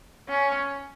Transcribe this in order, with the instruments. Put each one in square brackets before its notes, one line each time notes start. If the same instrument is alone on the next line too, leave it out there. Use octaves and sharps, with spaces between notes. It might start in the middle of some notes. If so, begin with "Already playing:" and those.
[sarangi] C#4